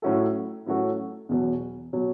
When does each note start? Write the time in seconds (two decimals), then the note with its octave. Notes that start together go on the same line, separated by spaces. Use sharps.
0.02 A2 F#3 C#4 F#4 A4
0.66 A2 F#3 C#4 F#4 A4
1.29 E2 B2 F#3
1.93 B2 F#3